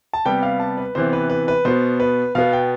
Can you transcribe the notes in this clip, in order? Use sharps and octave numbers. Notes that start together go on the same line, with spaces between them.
A5
C3 G3 B3 G5
F5
A5
B4
C3 E3 B3 C5
B4
B4
B4
B2 B3 C5
B4
B2 B3 F5
G5